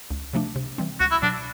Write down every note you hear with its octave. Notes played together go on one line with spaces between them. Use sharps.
C#2
C3 F3 A3 D4
C3
E3 G3 C4
C#2 F#4
E4
B2 F#3 D4